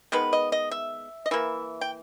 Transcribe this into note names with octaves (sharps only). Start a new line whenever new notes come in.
D#3 G#3 B3 B4
D#5
D#5
E5
D#5
E3 A#3 E5
G5